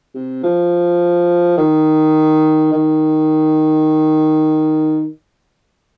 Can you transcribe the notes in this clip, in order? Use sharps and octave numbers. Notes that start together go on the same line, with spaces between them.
C3
F3
D#3
D#3